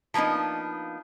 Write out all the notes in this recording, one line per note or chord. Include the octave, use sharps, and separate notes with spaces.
F3 A#3 B3 D4 D#4